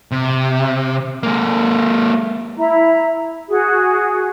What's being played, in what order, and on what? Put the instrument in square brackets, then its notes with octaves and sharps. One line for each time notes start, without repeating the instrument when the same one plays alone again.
[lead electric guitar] C3
G#3 A#3
[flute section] E4 E5 A#5
F#4 G#4